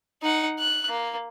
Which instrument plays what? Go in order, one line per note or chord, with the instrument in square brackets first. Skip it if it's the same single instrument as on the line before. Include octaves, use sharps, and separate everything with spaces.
[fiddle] D#4 F#5
F#6
A#3